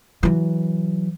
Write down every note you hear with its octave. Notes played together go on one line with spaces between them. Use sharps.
E3 F#3